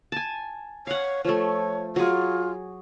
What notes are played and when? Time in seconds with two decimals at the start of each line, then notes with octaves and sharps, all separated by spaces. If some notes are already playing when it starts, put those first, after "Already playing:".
0.12 G#5 A5
0.87 C#5 F5 F#5
1.25 F3 A3 C#5
1.96 F#3 F4 G#4